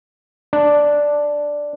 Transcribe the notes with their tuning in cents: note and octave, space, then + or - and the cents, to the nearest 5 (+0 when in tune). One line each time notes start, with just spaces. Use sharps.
D4 +0